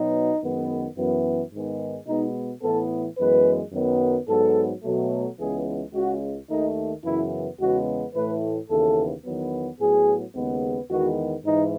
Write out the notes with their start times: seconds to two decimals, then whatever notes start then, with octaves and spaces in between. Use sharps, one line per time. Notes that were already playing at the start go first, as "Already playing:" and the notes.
Already playing: B2 F#3 B3 D#4
0.41 F#2 D#3 G#3 B3
0.97 F#2 E3 B3
1.52 G#2 D#3 G#3 B3
2.07 B2 G#3 B3 D#4
2.62 A2 E3 B3 A4
3.17 F#2 E3 G#3 B3 B4
3.72 F#2 D#3 F#3 B3
4.27 G#2 F#3 B3 A4
4.83 B2 F#3 A3
5.38 C#2 C#3 E3 G#3 B3 G#4
5.93 C#2 C#3 G#3 F#4
6.49 D#2 D#3 A3 D#4
7.03 F#2 C#3 E3 B3 E4
7.59 E2 C#3 G#3 B3 F#4
8.14 A2 E3 A3 B4
8.69 D#2 C#3 E3 B3 A4
9.24 E2 D#3 F#3 B3
9.79 A2 F#3 B3 G#4
10.34 D#2 C#3 G#3 B3
10.90 E2 D#3 G#3 B3 F#4
11.45 G#2 E3 D#4